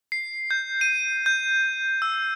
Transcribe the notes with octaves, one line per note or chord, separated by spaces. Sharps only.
C7
G6
D#7
G6
E6